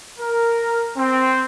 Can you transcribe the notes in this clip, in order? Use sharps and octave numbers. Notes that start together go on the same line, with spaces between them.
A#4
C4